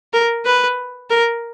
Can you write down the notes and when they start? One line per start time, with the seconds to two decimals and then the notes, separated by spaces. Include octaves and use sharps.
0.13 A#4
0.46 B4
1.10 A#4